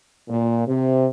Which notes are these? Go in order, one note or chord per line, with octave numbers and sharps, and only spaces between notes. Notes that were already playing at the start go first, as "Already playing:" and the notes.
A#2
C3